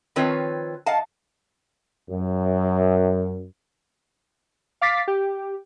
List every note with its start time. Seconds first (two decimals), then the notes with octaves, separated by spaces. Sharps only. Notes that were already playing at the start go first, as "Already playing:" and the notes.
0.16 D#3 F3 C4 F4 B4 C#5
0.86 D#5 F5 F#5 A5
2.10 F#2
4.81 F5 D6 A6 B6 C7
5.08 G4